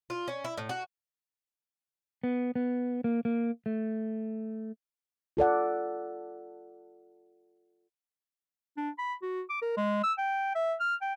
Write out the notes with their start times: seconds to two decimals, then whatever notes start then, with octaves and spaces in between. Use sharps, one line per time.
0.10 F4
0.28 C#4
0.44 E4
0.57 A2
0.69 F#4
2.23 B3
2.55 B3
3.04 A#3
3.25 A#3
3.66 A3
5.37 F4 A4 D5 F#5
8.77 D4
8.98 B5
9.22 F#4
9.50 D6
9.62 A#4
9.77 G#3
10.03 E6
10.18 G5
10.55 E5
10.80 F6
11.01 G5